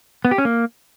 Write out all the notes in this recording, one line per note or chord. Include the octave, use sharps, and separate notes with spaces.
B3
G4
C#4
A#3